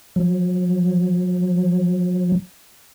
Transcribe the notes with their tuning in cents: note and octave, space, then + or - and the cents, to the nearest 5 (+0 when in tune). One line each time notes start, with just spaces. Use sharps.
F#3 -45